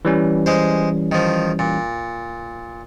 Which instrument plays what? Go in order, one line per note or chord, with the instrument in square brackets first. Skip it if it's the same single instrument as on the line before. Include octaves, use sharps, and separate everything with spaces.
[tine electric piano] E3 G3 C#4
[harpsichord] G#3 C5
D#3 F3
A#2